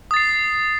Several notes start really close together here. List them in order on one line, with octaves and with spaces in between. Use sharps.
D#6 A6 C7